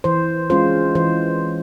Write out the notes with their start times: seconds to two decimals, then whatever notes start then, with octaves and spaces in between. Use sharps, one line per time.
0.04 E3 C5
0.50 G#3 C#4 F4 C5
0.95 E3 C5